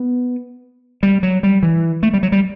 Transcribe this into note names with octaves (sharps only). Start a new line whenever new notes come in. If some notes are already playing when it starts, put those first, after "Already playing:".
Already playing: B3
G3
F#3
G3
E3
A3
G3
F#3
G3